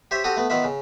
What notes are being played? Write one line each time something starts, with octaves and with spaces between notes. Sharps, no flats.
G4 C5 C#5 E5
C4 F#4 G4 A4 D#6
A3 B3
D#3 B3 F4 E5
C#3